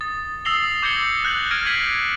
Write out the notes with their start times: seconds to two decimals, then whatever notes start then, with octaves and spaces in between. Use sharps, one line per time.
0.01 D#6 A6
0.45 D#6 E6 A#6 C7 F7 G7
0.83 D6 G6 G#6 A#6 C#7 G7
1.23 D6 F#6 G6 A#6 F#7
1.51 D6 F6 G#6 A#6 D7 D#7
1.66 G6 G#6 B6 C7 D#7 F#7